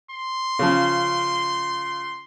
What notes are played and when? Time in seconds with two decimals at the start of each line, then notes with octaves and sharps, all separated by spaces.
0.11 C6
0.59 C#3 F3